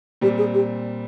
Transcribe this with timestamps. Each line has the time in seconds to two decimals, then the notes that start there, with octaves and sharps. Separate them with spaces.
0.21 A#2 G3 C4 G4
0.37 G#4
0.53 G4